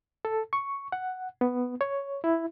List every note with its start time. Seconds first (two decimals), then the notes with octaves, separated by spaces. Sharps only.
0.25 A4
0.53 C#6
0.92 F#5
1.41 B3
1.81 C#5
2.24 E4